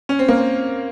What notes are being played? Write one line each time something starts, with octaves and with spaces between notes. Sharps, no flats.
C#4
C4
A#3
C4